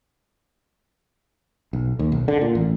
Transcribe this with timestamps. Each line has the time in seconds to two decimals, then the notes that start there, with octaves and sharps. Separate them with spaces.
1.73 B1
1.99 D#2
2.12 B1
2.28 D3
2.41 A#2
2.55 A1